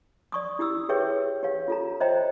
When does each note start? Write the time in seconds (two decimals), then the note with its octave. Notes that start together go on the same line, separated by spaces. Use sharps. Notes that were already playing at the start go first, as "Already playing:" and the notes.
0.32 D5 C#6 D#6
0.59 E4 G4 D#6 E6
0.89 G4 G#4 B4 C#5 E5 G5
1.43 G4 C#5 F5
1.68 F4 A4 A#5
2.00 C5 C#5 D#5 E5 G5 A#5